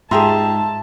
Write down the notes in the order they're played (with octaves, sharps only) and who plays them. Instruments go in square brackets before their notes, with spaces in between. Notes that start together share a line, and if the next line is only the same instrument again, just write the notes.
[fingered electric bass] G#2 [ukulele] F4 G4 G#4 [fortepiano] E5 A#5 C6 [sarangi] A5